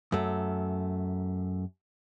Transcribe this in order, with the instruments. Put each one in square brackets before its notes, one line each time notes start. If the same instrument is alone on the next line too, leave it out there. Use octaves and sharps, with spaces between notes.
[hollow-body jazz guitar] F#2 A3